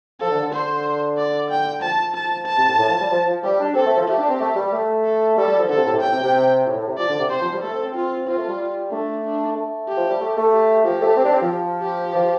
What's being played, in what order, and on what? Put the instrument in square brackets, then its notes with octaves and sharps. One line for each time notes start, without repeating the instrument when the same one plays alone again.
[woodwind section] F3 [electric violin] A4
[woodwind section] D3
D3
[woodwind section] D3 [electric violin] C5
[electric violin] D5
G5
[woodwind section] F3 [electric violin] A5
[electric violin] A5
A5
[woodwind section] C3
A2
A2
F3
G3
F3
F3
[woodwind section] G3 [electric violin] G4
[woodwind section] D4
[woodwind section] C4 [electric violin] A4
[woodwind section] A3
F3
[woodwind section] A3 [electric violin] G4
[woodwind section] D4
C4
A3
G3
A3
[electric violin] A4
[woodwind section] G3 [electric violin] A4
[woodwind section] G3
F3
[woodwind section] D3 [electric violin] A4
[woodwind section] C3
A2
C3
[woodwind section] A2 [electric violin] G5
[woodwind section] C3
C3
A2
A2
C3
[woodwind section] F3 [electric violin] D5
[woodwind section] D3
C3
[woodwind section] C3 [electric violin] C5
[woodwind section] F3
G3
[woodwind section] A3 [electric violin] A4
[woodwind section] C4
C4
[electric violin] F4
[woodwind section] C4 [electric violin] F4
[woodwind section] A3
G3
[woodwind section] A3 [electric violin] D4
[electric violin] D4
[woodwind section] A3
[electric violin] G4
[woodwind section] F3
G3
A3
A3
[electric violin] G4
[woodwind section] F3 [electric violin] G4
[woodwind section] A3
C4
D4
C4
F3
[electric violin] G4
[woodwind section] F3